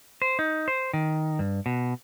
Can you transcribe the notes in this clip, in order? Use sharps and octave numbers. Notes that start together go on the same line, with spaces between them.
C5
D#4
C5
D#3
G2
B2